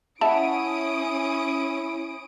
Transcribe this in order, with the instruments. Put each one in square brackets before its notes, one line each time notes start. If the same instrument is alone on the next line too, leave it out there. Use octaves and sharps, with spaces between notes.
[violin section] C#4 D#6 D7 [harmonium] E4 [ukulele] E5 F#5 [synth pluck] A5